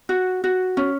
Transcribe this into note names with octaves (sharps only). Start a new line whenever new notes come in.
F#4
F#4
C#4